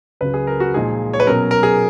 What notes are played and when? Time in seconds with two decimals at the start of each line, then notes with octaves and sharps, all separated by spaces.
0.21 C#2 C#3 F#3 B4
0.34 G#4
0.47 A#4
0.60 F#4
0.74 A#2 F3 G#3 D#4 G#4
1.13 C#5
1.20 B4
1.27 B2 F#3 C#4 A#4
1.51 A#4
1.63 G#4